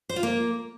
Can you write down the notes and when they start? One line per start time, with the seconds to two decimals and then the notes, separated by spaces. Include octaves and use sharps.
0.09 C5
0.16 F4
0.23 A#3